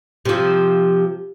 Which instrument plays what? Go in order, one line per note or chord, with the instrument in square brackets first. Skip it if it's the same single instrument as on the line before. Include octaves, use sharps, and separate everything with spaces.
[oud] C3 F3